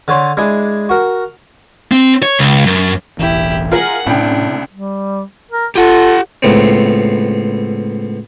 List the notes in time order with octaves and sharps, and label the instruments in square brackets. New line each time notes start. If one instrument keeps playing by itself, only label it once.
[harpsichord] D3 A4 C#5 C6
G#3 D4 E4 G#4
F#4 A#4
[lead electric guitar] C4
C#5
C#2
F#2
[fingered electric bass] E1 A1 E3 [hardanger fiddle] E4 G4
[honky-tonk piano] F4 A#4 [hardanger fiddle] G#4 F#5
[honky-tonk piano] C2 C#3 G5 [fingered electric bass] A2 [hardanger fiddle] D4
[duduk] G3
A#4
[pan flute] F4 [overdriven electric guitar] G4 F#5 [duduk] A4
[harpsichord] C#2 A2 B3 C4